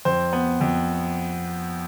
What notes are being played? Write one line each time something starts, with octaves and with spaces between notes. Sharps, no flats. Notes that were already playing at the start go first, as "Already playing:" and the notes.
F2 C5
B3
F2